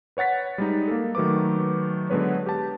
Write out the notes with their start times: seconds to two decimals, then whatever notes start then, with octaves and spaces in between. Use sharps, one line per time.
0.17 B4 C#5 F#5 A6 B6
0.58 G3 G#3 D#4
0.88 A#3 A4
1.15 D#3 F#3 A3 B4 D6
2.10 D3 F#3 G#3 B3 B4 C#5
2.46 G4 A5